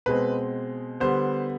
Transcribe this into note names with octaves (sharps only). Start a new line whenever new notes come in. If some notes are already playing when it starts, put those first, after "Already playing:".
B2 G#3 C4 B4
D3 G3 B3 C5